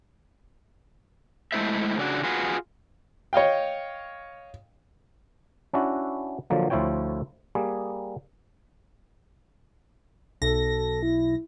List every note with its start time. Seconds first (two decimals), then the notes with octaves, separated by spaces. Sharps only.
1.52 G#3 A3 E4 C5 E5
1.98 C#3 D4 F#4
2.24 F4 F#4 G#4 B4
3.33 C#5 D#5 F5 G5
5.73 C#4 D4 E4 F#4
6.50 D3 F3 F#3 A#3
6.70 D2 F3 E4 F4 C#5 G5
7.55 G3 A#3 G#4
10.42 B1 A4 A#6
11.03 E4